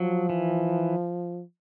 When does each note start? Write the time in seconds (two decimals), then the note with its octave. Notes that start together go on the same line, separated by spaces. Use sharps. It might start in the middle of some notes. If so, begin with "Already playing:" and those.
Already playing: F3 F#3
0.30 E3